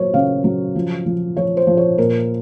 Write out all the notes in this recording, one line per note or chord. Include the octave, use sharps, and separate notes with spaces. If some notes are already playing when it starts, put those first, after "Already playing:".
Already playing: F#3 A#3 A#4 C5 C#5
C#3 F5
F#3
F3
F3
F3 C#5
C5
F3
C#5
A#2 A#4